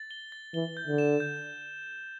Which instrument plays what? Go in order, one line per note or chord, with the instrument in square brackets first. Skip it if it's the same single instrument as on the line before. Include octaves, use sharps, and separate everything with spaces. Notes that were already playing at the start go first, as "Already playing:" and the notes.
Already playing: [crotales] A6
G7
A6
[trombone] E3 [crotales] G7
[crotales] G6
[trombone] D3
[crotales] E7
G6